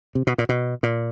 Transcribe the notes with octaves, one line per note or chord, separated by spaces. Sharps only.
C3
B2
A#2
B2
A#2